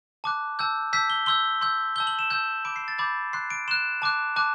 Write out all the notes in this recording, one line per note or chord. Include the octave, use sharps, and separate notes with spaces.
A5 D6 F#6
A5 E6 G6
A5 E6 G6 B6
G7
C6 E6 G6 G7
C6 E6 G6
A5 E6 G6 G7
F#7
E7
A5 E6 G6
B5 D6 G6 D7
C7
A6
B5 D6 G6 A6
C6 F#6 C7
D7
C6 F#6 E7
A5 D6 F#6
A5 D6 F#6